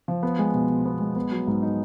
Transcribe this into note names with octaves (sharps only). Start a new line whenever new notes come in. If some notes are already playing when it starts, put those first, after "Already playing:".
F3
B3
G#3
B2
B2
B3
G#3
B3
F#3
G#2
D#4